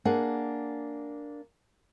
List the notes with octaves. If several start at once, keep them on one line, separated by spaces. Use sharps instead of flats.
A#3 D4 G#4 F#5